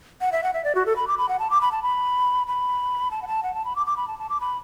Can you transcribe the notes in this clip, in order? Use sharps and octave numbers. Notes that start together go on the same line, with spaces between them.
F#5
E5
F#5
E5
D5
F#4
A4
B5
D6
B5
F#5
A5
D6
B5
A5
B5
B5
A5
F#5
A5
F#5
A5
B5
D6
D6
B5
A5
A5
D6
B5